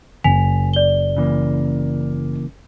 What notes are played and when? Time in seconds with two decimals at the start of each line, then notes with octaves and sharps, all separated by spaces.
0.24 F#1 G#5 B6 F7
0.74 D5 G7
1.16 C#3 E3 A#3